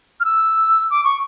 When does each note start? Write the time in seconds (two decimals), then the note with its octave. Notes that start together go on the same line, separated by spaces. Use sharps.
0.20 F6
0.25 E6
0.91 D6
1.04 C#6